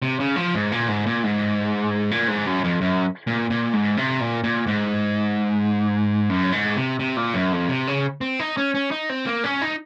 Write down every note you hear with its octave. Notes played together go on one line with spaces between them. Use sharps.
C3
C#3
F3
G#2
A#2
G#2
A#2
G#2
A#2
G#2
F#2
F2
F#2
A#2
A#2
G#2
C3
A#2
A#2
G#2
F#2
G#2
C3
C3
A#2
F#2
F2
C3
C#3
C4
D#4
C#4
C#4
D#4
C4
A#3
C#4
D#4